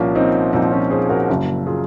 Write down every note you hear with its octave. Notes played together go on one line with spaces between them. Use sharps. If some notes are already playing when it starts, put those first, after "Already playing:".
Already playing: C2 A#2 F3 A#3 C#4
C4 D#4
C2 A#2 F3 C4 D#4
C#4 F4
G#4 C5
F#4 A#4
F#1 F#2 C#3
F4 G#4